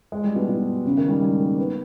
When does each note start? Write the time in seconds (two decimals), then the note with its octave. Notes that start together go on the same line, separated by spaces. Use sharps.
0.12 G#3
0.24 G3
0.35 B2
0.49 B2
0.85 C#3
0.97 D#3
1.09 G3
1.22 G#3
1.39 A#3
1.58 B3